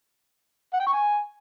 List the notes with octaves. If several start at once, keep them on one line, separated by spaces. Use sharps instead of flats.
F#5
G5
C#6
G#5